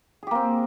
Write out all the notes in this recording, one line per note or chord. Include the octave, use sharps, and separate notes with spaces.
A#3 C4 G4 G#4